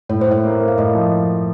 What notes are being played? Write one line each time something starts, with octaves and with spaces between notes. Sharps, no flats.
A2 C#5
C5
A2 C#5
A#3
A#3
F5
A2 D#5
F3